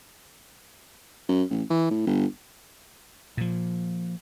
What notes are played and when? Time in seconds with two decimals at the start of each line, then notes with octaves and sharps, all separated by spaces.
1.29 F#2
1.50 A1
1.70 E3
1.91 A2
2.07 G1
3.37 A#2 F3